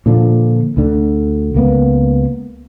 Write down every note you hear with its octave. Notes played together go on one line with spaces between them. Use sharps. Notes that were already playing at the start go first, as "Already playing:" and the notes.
A#2 D3 F3
D2 D3
C#2 A#3 B3